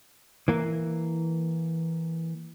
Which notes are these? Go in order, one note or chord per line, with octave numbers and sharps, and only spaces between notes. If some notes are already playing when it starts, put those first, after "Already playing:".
E3 A#3